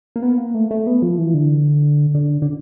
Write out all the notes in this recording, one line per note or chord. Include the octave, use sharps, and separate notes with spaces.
A#3
B3
A#3
A3
A3
B3
F3
E3
D3
D3
D3